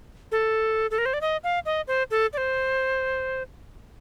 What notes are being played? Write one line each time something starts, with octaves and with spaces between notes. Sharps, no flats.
A4
A4
A#4
C5
D5
D#5
F5
D#5
C5
A4
D5
C5